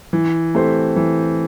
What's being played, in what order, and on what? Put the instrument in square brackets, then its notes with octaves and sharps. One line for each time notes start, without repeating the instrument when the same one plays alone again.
[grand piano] E3
A3 C4 G4 C5
E3